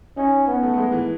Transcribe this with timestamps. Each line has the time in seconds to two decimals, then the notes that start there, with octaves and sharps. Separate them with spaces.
0.17 C#4 D#4
0.47 B3 C#4
0.63 A3
0.74 A3
0.78 G#3
0.92 E3